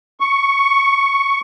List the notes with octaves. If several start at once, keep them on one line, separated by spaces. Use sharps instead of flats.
C#6